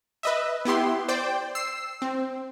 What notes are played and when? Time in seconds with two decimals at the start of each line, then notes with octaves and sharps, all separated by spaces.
0.23 B4 D#5 E5
0.65 B3 E4 G4 C6
1.08 C5 D5 G5
1.55 E6 C7
2.02 C4